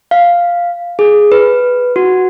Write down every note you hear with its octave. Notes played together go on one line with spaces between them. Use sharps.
F5
G#4
B4
F#4